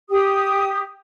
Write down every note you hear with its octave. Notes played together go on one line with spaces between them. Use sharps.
G4 D#6